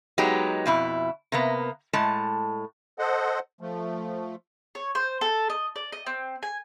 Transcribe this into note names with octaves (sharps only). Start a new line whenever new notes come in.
F#3 G#3 B3 D#4 G4
F2 B2 E4
C3 A#3 B3
A2 G#3 A5
A4 C5 D#5 F#5
F3 A3
C#5
C5
A4
D#5
D5
D#5
C4
G#5